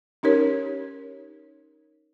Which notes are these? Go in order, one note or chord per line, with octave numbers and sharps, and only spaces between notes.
C#4 D#4 G4 A#4 C#5